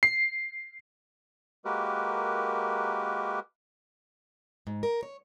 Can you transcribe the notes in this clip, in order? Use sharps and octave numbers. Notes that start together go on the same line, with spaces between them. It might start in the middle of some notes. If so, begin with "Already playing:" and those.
C7
G#3 A#3 F#4 G4 A#4 B4
G#2
A#4
C#5